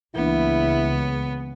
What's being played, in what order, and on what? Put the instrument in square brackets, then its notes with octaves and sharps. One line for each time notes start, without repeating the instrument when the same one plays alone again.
[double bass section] C#2 C#3 [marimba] E3 A#3 D4 [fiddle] B3 [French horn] E4